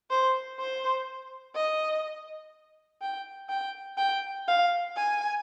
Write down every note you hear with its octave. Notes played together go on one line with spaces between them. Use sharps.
C5
C5
D#5
G5
G5
G5
F5
G#5